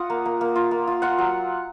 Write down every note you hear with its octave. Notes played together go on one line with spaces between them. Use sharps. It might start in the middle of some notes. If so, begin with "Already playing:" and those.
Already playing: F4 D#5 F#5
A#3
A#3
A#3
F4
A#3
F4
F4 F#5
F#3